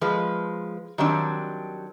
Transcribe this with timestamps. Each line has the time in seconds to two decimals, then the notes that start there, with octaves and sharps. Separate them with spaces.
0.01 F3 G#3 B4
0.98 D#3 F#3 G3 C4 D4